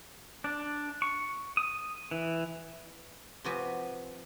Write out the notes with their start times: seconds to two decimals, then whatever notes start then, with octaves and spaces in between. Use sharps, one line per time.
0.44 D4
1.02 C#6
1.57 D#6
2.11 E3
3.45 C3 F3 F#4 B4 G#5